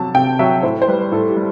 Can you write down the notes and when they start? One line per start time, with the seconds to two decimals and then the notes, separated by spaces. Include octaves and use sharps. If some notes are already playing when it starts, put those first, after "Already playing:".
Already playing: C3 F#3 A5
0.15 C3 G5
0.39 F#3 E5
0.63 A2 C5
0.82 C5
0.88 G3 B4
1.12 A2 A4
1.28 G4
1.36 G3